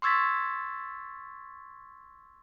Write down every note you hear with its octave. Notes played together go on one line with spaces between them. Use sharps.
C6 C#6 E6 G#6 A6 B6